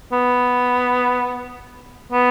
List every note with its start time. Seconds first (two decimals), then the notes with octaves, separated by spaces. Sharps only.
0.12 B3
2.12 B3